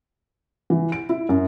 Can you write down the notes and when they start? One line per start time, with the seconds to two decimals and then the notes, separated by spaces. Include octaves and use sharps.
0.70 E3
0.92 D7
1.09 E4
1.29 F#2